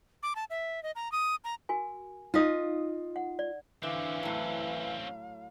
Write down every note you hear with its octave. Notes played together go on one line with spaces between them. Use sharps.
D6
A5
E5
D#5
A#5
D#6
A#5
F#4 A#4 G#5
D#4 F4 D#5 F5 D#6
F#5
D5
D3 E3 C4 C#4 F5
A2 F#3